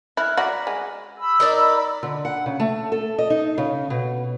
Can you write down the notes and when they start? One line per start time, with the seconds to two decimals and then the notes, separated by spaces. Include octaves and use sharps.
0.17 E4 F6 F#6 G#6
0.37 F#4 D5 A#5 B5
0.67 G#3
1.18 B5 E6
1.40 D#4 A#4 D5
2.03 D3
2.25 F#5
2.46 C#3
2.60 A3
2.92 A4
3.18 D#5
3.30 D#4
3.58 C#3
3.90 B2